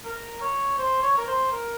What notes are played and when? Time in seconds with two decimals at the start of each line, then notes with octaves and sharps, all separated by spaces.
0.04 A#4
0.41 C#5
0.78 C5
1.02 C#5
1.17 A#4
1.27 C5
1.51 A#4